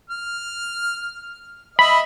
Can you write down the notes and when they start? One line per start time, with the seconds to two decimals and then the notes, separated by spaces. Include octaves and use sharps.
0.10 F6
1.79 D#5 E5 B5